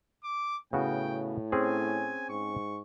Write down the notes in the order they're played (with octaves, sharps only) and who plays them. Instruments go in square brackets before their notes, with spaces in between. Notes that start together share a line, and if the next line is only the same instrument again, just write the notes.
[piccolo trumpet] D6
[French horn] A2 [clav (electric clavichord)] C#3 B3 F#4 [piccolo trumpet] G5
[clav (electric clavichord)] C4 C#4 G#4 [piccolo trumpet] G#5
[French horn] G#2 [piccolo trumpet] C#6